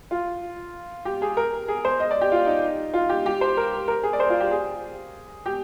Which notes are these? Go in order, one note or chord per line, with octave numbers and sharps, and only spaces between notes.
F4
G4
G#4
A#4
G#4
C5
D#5
D5
G4
F4
D#4
F4
G4
G4
C5
A#4
A#4
G#4
D5
C5
F4
G4
G#4
G4